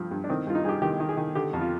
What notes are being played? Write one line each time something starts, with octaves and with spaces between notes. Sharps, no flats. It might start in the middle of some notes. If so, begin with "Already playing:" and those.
Already playing: G2 F3
G2
D4
D#3 C4
G2 F4
D#4
G2 G4 G#4
D#3 G4
D#3
G#4
D#3
D3 G4
F2
F4